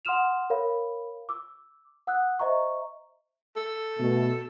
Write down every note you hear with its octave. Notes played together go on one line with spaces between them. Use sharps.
F#5 C6 D#6 F6 E7 F7
A#4 C#5 F5 B5
D6 E6
F#5 D#6 E6 F#6
C5 D#5 E5 A#5 C#6
A4
B2 A3